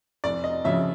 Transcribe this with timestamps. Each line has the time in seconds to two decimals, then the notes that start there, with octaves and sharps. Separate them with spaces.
0.24 F1 D5
0.44 D#5
0.64 F2 C#3 F3 E5